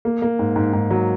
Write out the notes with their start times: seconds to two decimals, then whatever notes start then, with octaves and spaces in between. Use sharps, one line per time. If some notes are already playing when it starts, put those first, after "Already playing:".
0.05 A#3
0.22 A#3
0.39 G#2
0.56 G#2
0.73 G#2
0.90 F#3